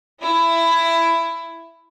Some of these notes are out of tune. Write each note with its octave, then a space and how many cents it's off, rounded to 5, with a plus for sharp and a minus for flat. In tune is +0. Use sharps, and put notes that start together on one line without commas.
E4 +15